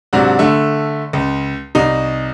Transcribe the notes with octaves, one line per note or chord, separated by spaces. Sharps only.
G#2 C3 F#3 D4 F#4
D3 A3
C#2
C2 D#4